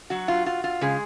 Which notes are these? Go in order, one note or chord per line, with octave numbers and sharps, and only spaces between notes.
F#3 F#4
F4
F4
F4
C#3 G#3 G#4